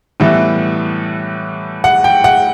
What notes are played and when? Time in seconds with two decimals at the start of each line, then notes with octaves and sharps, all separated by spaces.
0.20 A2 E3 G3 B3 E5
1.84 F#5
2.04 G5
2.24 F#5